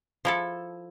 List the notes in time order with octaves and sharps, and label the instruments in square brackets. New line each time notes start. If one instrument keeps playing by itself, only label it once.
[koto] F3 E4 A4